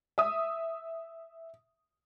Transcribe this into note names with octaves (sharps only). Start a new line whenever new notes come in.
E5 D#6